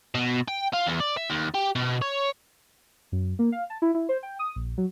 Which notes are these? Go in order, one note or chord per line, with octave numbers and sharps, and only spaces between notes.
B2
G5
F4
E2
D5
E5
D#2
G4
B2
C#5
F#2
A#3
F5
A5
E4
E4
C5
G5
D#6
A#1
F#3